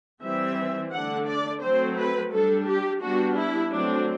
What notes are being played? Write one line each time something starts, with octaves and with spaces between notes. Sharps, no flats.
E3 G3 C4 E5
D3 A3 D4 F#5
D5
F#3 A3 C4 C5
B4
G3 D4 A4
G4
G3 B3 D4 F#4
E4
F#3 A3 C4 D4